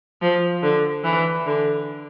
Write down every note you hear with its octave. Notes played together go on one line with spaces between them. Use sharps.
F3
D3
E3
D3